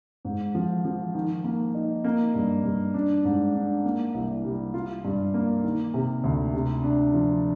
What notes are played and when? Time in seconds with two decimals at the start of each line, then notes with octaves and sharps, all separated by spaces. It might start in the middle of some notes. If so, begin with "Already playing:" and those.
0.25 G#2
0.55 F3
0.85 F3
1.15 D#3
1.44 A#3
1.74 D#4
2.04 A#3
2.35 G2
2.64 G2
2.94 D4
3.25 G#2
3.54 D4
3.85 A#3
4.14 C2
4.45 G3
4.74 F4
5.05 G2
5.34 A#3
5.64 D#3
5.94 C3
6.24 D2
6.54 C3
6.83 D4
7.14 F3